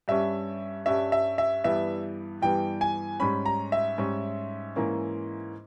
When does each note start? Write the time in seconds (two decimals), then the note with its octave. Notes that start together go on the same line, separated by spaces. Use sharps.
0.08 G2 G3 C#4 E5
0.86 G2 G3 C#4 E5
1.12 E5
1.38 E5
1.64 G2 E3 G3 B3 E5
2.42 G2 E3 G3 B3 G5
2.81 G#5
3.20 G#2 G3 C#4 B5
3.46 A#5
3.72 E5
3.98 G#2 G3 C#4
4.76 G#2 E3 A#3 C#4